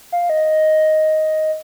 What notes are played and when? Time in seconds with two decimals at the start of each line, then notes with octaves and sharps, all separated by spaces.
0.12 F5
0.30 D#5